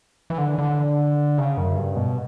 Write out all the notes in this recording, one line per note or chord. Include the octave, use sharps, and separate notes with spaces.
E3
D3
D3
C#3
F#2
G2
B2